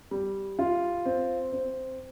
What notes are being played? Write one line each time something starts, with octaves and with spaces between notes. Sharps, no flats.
G3
F4
C4
C4